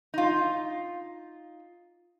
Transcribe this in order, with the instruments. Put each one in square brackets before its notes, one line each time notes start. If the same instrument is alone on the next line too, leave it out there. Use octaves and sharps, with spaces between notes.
[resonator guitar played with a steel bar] D#4 F4